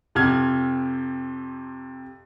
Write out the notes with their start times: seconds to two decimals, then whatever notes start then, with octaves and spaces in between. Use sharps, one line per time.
0.15 F2 C3 F6 G#6